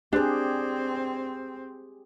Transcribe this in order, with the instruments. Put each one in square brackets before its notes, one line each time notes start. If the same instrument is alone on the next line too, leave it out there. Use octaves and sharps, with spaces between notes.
[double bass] C4 [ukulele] D4 [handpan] G4 G#4